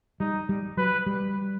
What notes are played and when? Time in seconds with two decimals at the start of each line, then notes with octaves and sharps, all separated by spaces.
0.20 G3 D#4
0.49 G3
0.77 F#3 B4
1.06 G3